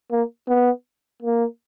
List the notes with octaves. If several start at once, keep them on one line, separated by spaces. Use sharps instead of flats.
A#3
B3
A#3